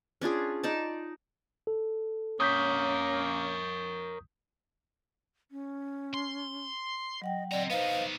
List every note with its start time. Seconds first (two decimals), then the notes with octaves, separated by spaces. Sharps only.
0.21 C#4 D4 F4 G#4
0.63 D#4 D5 A5
1.67 A4
2.40 A#3 C#4 A#4 C#5 D#6 G6 B6
5.51 C#4
6.14 C6
7.22 F#3 D#5 F#5 G5
7.51 C4 D5 D#5 A#5
7.70 B3 D#4 B4 C5 F5